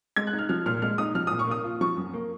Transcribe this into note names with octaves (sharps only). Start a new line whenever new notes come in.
G#3 G#6
F#6
D#4
F6
F3 F6
A#2 F6
G#3 F6
D#4 D#6
F3 F6
A#2 D#6
C#6
A#3 D#6
F4
F3 C#6
F#2
A#3